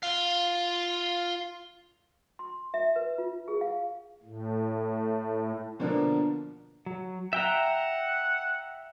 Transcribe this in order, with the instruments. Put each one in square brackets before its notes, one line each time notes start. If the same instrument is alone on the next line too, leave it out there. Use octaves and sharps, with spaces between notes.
[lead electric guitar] F4 F5
[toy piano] C6
E5
B4
F4
G#4
F5
[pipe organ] A2
[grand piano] B2 D3 F3 A#3 D4 A#4
[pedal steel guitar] F#3
[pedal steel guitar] E5 G5 A#5 [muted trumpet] F#5